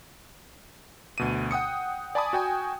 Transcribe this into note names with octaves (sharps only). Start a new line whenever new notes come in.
D2 B2 D#7
F#5 G5 D#6 C#7
D5 G#5 A5 B5 D6 D#6
F#4 G5 G#5